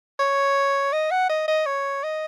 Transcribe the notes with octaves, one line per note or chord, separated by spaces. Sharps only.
C#5
D#5
F#5
D#5
D#5
C#5
D#5